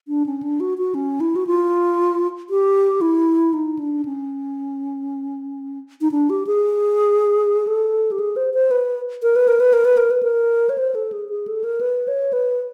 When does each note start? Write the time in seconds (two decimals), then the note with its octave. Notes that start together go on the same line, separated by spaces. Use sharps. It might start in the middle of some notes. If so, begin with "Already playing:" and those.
0.08 D4
0.26 C#4
0.43 D4
0.60 F#4
0.78 F#4
0.94 C#4
1.20 E4
1.36 F#4
1.47 F4
2.50 G4
3.01 E4
3.53 D#4
3.79 D4
4.05 C#4
6.01 D#4
6.12 D4
6.30 G4
6.47 G#4
7.67 A4
8.11 G4
8.19 G#4
8.36 C5
8.54 C5
8.71 B4
9.23 A#4
9.36 B4
9.48 A#4
9.60 B4
9.73 A#4
9.85 B4
9.97 A#4
10.11 B4
10.23 A#4
10.69 C#5
10.78 C5
10.95 A4
11.12 G#4
11.29 G#4
11.48 A4
11.64 A#4
11.81 B4
12.08 C#5
12.33 B4